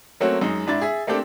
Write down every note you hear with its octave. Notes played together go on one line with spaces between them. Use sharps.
F#3 A3 A#3 C4 C#4 F#4
F#2 G#3 D#4
G#2 D4 E4 A6
G#4 E5
A3 A#3 C4 D4 G4 A4